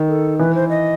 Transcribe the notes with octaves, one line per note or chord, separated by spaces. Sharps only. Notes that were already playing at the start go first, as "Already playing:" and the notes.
Already playing: D#3
A4
E3 B4
C5
D#5